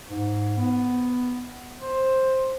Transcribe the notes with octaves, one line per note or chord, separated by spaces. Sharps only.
G#2
B3
C5